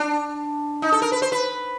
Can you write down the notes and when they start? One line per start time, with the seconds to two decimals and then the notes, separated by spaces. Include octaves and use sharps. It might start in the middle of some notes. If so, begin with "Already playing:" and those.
Already playing: D4
0.82 D#4
0.92 A4
1.02 A#4
1.12 B4
1.22 C5
1.32 B4